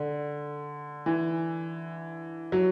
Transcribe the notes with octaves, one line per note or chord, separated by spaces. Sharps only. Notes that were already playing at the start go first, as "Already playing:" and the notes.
Already playing: D3
E3
F#3